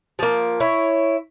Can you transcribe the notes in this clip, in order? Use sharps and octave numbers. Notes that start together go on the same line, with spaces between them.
F3 A#3
E4 C#5